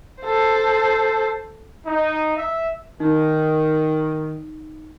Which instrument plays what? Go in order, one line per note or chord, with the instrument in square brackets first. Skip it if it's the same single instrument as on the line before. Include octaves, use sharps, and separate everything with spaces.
[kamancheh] A4 C5
[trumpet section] D#4
E5
[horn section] D#3 [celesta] D#4